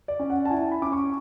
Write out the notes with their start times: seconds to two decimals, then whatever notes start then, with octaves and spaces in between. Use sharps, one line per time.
0.08 D5
0.19 C#4
0.30 F#5
0.45 A5
0.50 E4 G#5
0.71 B5
0.82 C#4 D6
0.92 C#6